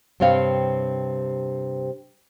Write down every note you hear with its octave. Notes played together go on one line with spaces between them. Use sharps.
G2 C3 C4 C#5 F5 G5